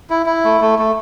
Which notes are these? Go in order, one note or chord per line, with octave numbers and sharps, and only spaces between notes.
E4
E4
A3
A3
A3